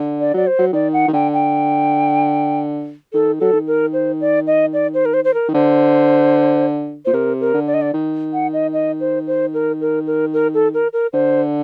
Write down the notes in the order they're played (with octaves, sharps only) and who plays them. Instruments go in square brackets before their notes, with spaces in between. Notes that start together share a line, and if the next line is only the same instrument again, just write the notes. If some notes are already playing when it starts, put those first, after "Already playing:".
Already playing: [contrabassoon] D3
[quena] D5
[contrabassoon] F#3 [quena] D5
[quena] C5
[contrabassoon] F#3
[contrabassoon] D#3 [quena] D5
[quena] F#5
[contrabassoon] D#3
[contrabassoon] D3 [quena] G5
[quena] G5
[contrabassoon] D#3 [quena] A4
[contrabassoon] F#3 [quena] A4
[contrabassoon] D#3
[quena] A#4
C5
D5
D#5
D5
C5
A#4
C5
C5
A#4
[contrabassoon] D#3
[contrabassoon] D3 [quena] C5
[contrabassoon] A#2 [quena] C5
[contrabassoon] C3 [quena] A#4
[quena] A#4
[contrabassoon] D3
[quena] D5
D#5
D5
[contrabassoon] D#3
[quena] F#5
D#5
D#5
C5
C5
A#4
A#4
A#4
A#4
A4
A#4
A#4
[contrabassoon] D3 [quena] C5